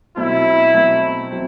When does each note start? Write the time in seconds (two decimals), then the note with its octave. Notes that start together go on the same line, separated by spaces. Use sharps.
0.17 B2 F#3 A3 C4 E4
0.74 B2 F#3 A3 C4
1.31 F#3 C4